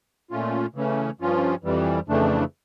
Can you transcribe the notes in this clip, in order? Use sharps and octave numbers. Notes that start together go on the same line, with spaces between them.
A#2 A3 C#4 F4
C#3 E3 A3 C#4
G2 F3 C#4 F4
F2 E3 G3
F2 C#3 E3 A3 D4